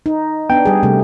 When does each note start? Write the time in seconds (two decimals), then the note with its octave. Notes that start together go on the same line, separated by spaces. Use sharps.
0.06 D#4
0.50 B3 D4 G5
0.65 G3 G#4
0.83 C3 G3 A3